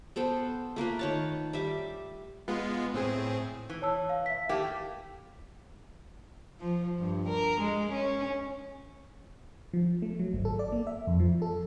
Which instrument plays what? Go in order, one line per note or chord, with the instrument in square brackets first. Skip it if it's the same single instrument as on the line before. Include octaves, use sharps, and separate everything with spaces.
[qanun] B3 A4 C5 G5
A3 A#3 F4 B4
D#3 C#5 A5
G3 E5 D6
[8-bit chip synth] G#3 B3 F4
A2 C4 G#4
[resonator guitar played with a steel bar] E3
[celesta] C#5 A5 E6
F5
E5 B6
[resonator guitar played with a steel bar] A3 A#3 G4
[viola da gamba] F3
G2
A#4
G#3
C#4
[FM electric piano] F3
A3
F#3
G#1
A4
D5
A#3
E5
F2
F3
A4